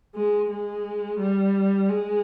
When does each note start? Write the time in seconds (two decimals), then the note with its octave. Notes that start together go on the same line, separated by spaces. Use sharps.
0.15 G#3
0.50 G#3
1.20 G3
1.89 G#3